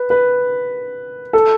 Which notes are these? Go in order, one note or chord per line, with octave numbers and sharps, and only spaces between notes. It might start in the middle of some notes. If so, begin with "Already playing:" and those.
Already playing: B4
B4
A4